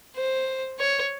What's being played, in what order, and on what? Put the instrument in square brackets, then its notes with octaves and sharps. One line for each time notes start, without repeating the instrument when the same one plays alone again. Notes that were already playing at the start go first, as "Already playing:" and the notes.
[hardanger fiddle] C5
C#5